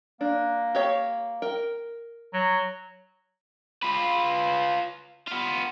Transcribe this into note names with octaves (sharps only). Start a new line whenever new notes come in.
A#3 D4
G4 C#5 F5
A#4 G5
F#3
F4 B4
B3 F4